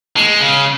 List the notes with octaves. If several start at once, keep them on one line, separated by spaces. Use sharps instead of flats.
G#3
C#3